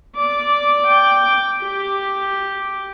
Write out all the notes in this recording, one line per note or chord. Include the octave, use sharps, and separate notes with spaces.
D5 D6
G5 D6
G4